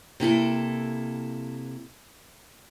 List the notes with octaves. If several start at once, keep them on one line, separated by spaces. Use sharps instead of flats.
C3 A#3 E4 A4